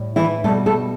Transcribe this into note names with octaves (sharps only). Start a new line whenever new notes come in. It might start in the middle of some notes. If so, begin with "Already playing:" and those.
Already playing: A2 G3
E3 E4
B2 G3 A3 A4
A3 A4